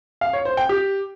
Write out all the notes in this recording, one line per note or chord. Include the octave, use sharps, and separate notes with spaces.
F5
C#5
C5
G5
G4